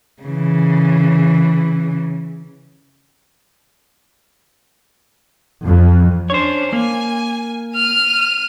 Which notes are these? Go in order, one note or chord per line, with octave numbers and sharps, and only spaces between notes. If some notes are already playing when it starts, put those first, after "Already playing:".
C#3 E3
F2
C#4 D4 C5 C#5
A#3 G#5
F6 D#7